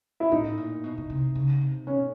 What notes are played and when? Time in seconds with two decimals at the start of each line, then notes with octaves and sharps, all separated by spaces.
0.20 E4
0.32 A2 D#4
0.57 A#2
0.84 B2
0.98 B2
1.10 C3
1.35 C#3
1.61 C3
1.87 B2 C#4